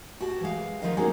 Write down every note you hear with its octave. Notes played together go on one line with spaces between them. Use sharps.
F#4 G4 A5
E3 G#3 F5
D3 D#3 F3 B4 D#5 F5
G#3 A#3 C#4 D#4 F#4 G#4